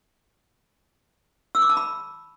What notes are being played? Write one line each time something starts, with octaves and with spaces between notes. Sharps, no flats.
E6
D6
A5
B5